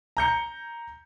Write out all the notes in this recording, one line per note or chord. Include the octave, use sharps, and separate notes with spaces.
A#5 G6 C#7